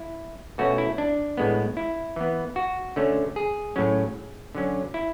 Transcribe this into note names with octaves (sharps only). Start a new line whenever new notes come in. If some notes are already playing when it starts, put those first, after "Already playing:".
Already playing: E4
B2 A3 C#4 F#4
E4
D4
A2 G#3 B3
E4
E3 B3
F#4
D3 A3 C#4
G#4
A2 F#3 C#4
D3 F#3 C#4
E4